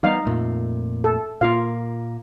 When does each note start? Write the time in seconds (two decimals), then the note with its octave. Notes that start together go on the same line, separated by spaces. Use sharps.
0.03 E3 G3 B3 D#4 F5
0.25 F2 A#2 A3
1.04 A4
1.41 A#2 A#3 F4 F5